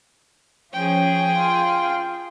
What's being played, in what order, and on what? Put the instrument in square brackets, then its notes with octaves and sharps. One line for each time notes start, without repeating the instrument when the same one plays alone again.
[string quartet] F3 C#4 [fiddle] G#4 G5
[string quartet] F4